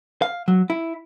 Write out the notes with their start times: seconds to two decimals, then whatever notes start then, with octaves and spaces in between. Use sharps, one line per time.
0.22 F5
0.48 F#3
0.70 E4